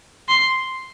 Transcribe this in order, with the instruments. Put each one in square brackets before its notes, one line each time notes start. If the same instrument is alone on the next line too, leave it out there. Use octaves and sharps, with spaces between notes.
[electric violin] C6